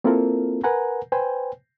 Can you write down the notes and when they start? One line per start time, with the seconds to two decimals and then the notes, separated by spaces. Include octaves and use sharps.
0.04 A#3 C4 E4 F4 A4 A#4
0.64 A#4 B4 F#5 G#5 A#5
1.12 B4 C5 G5 G#5